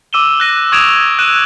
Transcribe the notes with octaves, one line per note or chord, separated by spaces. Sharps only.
D6 E6 D#7 E7 G7
F#6 A#6 D#7
C#6 D#6 G#6 D7 E7 F7
E6 F#6 D#7 E7